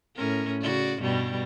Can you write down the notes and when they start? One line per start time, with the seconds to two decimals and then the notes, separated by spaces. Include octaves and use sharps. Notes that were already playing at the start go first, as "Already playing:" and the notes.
0.16 A2 C#4 A#4
0.62 C#3 F#4 D5
1.01 G2 B2 G3